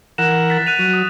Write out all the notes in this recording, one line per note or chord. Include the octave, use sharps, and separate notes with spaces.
E3 A#4 F#5 E7
A6 B6
F#6 D#7 F7
F#3
D#6